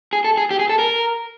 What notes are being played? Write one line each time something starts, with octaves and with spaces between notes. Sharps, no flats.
G#4
A4
G#4
G4
G#4
A4
A#4